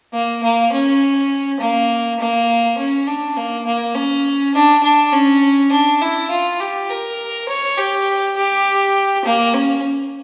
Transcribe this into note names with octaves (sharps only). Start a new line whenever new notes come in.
A#3
A#3
C#4
A#3
A#3
C#4
D4
A#3
A#3
C#4
D4
D4
C#4
D4
E4
F4
G4
A#4
C#5
G4
G4
A#3
C#4